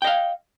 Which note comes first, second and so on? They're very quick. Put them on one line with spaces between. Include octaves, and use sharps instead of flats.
G5 D#5 F5